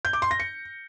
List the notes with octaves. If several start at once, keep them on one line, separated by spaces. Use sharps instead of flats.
G6
D6
C6
A#6
C#7